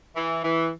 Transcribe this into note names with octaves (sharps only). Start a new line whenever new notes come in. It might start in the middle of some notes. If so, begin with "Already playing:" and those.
E3
E3